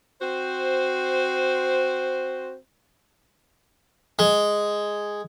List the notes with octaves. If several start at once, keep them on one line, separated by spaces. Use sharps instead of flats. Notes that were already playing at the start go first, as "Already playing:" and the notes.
C4 F#4 C5
G#3